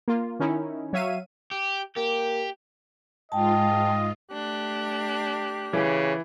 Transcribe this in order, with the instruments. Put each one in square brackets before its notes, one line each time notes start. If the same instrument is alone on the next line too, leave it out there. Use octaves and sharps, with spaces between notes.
[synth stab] A#3 F4
D#3 C#4 D#4 E4
F#3 C#5 E5 F5 D#7
[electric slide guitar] G4
[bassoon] A#3 [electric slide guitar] G4
[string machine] G#2 F4 [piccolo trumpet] D#5 [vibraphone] G5 A5
[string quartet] A3 D4 F#6 [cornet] G4
[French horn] C#3 [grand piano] E3